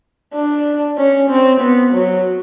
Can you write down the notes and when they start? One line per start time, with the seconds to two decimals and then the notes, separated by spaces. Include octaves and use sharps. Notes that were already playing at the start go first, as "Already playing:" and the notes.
0.34 D4
0.98 C#4
1.30 C4
1.61 B3
1.93 F#3